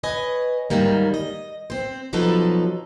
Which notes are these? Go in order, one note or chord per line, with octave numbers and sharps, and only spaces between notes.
B4 C#5 D#5 G#5
G#2 C3 D#3 F#3 G3 A#3
D#5
C4 C5
B2 F3 F#3 D#4 A4 B4